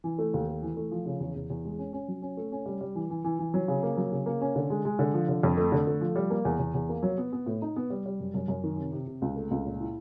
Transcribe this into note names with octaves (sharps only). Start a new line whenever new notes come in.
E3
A3
D#2
A3
E3
A3
F3
C#3
E2
E2
E2
G#3
C#4
C#4
F#3
C#4
A3
C#4
G3
G3
E3
E3
E3
E3
F#3
C#3
A#3
F#3
C#3
A#3
C#4
D3
G#3
G#3
D3
F3
D3
F2
A3
D3
A3
F3
G3
A#3
E2
E2
E2
A#3
F#3
B3
B3
A2
D#4
B3
G3
G3
F#2
F#2
F#2
D#3
C3
C3
C3
C#2
A3
C#2
A#2
E4